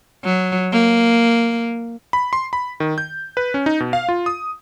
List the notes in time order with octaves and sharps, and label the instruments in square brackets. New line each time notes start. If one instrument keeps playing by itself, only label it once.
[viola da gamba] F#3
A#3
[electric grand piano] B5
C6
B5
D#3
G6
B4
C#4
D#4
B2
F5
F4
D#6